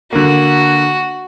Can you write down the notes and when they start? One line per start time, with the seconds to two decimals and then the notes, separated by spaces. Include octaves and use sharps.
0.13 D3 A#3 F#4